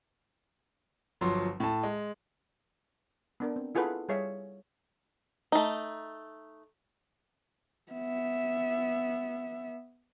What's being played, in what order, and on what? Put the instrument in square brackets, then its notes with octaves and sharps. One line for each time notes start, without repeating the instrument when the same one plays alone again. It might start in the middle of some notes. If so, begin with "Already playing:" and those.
[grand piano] G1 F3 F#3 C6
A2 A5
G#3
[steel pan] B3 D4 A#4
C4
E4 F4 G#4 A4 B4 F#5
G3 G#4 C#5 E5 F5
[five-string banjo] A3 D#4
[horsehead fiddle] B3 E5